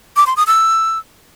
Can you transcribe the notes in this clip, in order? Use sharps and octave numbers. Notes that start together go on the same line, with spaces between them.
D6
C6
D#6
E6